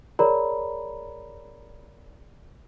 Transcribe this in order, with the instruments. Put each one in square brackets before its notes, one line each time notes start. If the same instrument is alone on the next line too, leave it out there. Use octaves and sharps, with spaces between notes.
[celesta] G#4 A#4 C#5 D5 A#5 B5